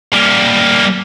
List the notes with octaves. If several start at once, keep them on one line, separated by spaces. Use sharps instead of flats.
G3 A#3